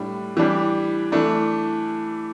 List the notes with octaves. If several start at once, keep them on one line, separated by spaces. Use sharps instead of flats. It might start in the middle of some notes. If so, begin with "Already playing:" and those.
Already playing: A2 G3 D4
E3 G3 D4 G4
E3 A3 D4